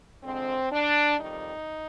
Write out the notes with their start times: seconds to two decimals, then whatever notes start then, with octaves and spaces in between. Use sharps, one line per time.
0.23 F2 D3 G#3 C4
0.72 D4
1.19 F2 D#3 G3 D#4